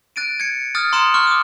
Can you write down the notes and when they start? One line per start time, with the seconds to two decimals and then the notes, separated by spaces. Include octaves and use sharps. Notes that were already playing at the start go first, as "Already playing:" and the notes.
0.16 F#6 A6 D7 D#7
0.40 G#6 A6 C#7
0.75 D#6 F6 F#6 A6
0.92 A#5 C6 D#6 F#6 C#7 E7
1.14 C#6 F6 F#6
1.27 D6 D#6